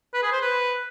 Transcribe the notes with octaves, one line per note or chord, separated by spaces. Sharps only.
B4
G#4
C5
B4